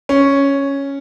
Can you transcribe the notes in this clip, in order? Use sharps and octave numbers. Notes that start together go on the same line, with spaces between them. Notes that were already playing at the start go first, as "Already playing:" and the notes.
C#4